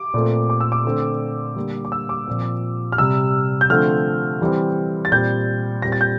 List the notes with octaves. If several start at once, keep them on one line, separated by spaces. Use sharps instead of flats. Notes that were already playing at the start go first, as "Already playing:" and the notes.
Already playing: D6
A#2 A3 C4
D6
E6
D6
D3 A3 C4
D3 G3 A#3
D6
E6
D6
A#2 F3 C4
F6
C3 G3 C4 E6
G6
D3 F3 A3 C4 F6
E3 G3 C4
A6
A#2 G3 C4 G6
A#2 G3 C4 A#6
A6
G6